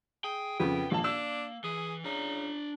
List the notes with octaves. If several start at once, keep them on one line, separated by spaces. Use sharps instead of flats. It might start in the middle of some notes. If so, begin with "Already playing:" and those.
G#4 G5
F2 C#3 B3
A#1 A#3 A5
D4 E6
E3 G#4
C#3 D4 A#5